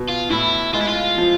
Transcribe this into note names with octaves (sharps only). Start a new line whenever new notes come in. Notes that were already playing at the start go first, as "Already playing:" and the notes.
Already playing: B2
F4
A2 E4
G#3 F4
E4
F4
F3